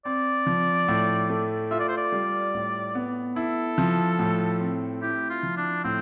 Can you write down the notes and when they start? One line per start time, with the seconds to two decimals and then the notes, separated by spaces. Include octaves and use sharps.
0.05 C4 D5
0.47 F3
0.88 A2
1.29 A3
1.71 F4 E5
1.80 D5
1.88 C5
1.97 D5
2.12 G3
2.54 A2
2.95 B3
3.36 E4 A4
3.78 F3
4.19 A2
4.60 C4
5.02 E4 G4
5.30 F4
5.43 F3
5.57 D4
5.84 A2 C4